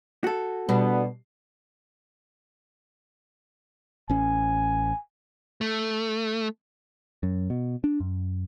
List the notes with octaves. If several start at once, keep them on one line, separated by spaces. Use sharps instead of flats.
F#4 A4
B2 G3 B3 D4
A1 C#4 G#5
A3
F#2
B2
D4
F#2